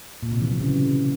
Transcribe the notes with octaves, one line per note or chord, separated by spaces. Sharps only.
A#2
C3
E3
F#3
C#3